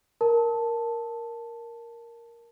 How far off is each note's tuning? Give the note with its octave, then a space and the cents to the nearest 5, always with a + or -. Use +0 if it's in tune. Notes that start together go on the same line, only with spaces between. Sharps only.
A#4 +0 A5 +0